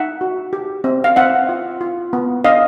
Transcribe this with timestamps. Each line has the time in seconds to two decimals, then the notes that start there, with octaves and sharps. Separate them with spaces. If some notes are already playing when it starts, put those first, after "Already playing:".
Already playing: D#4 E5 F#5
0.21 F#4
0.53 G4
0.84 C4
1.04 F5
1.16 C4 E5 F#5
1.49 F4
1.81 F4
2.13 B3
2.44 D4 D#5 F5